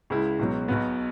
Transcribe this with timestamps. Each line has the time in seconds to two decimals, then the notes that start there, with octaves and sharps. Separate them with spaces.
0.10 C#2 C#3 G#3 E4
0.39 C#2 B2 F#3
0.68 B1 B2 B3